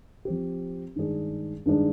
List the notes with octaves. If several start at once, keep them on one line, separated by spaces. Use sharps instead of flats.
F3 C4 G4
G2 D#3 G#3 D4 G#4
G2 D#3 G#3 D4 G#4